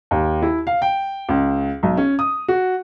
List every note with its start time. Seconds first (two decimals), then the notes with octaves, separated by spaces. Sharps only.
0.11 D#2
0.42 E4
0.67 F5
0.82 G5
1.29 C#2
1.83 B1
1.97 C#4
2.19 D#6
2.48 F#4